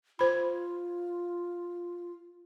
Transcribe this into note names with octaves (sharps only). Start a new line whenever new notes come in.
F4 C5 B5